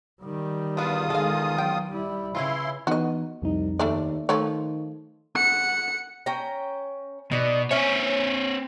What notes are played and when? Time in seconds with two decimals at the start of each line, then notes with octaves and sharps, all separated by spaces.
0.22 D#3 G3
0.77 E2 B3 D4 F4 D#6
1.10 D#3 G#3 A4 F5
1.58 F#3 G5
1.89 G3 E4
2.35 C#3 E3 C#4 E4 F4 C6
2.87 E3 B3 D#4 F#4 D#5
3.42 C2 F2 D#4
3.79 D#2 A3 D4 D5
4.29 D#3 F3 A3 A4 C#5
5.36 F#5 C#7
6.26 C#4 G5 A#5
7.32 B2 D#4 D5
7.71 C4 C#4 C#5 E5 G#5